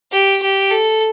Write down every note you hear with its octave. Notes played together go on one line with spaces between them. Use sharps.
G4
G4
A4